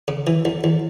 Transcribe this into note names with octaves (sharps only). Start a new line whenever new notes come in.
C#3
E3
E2
E2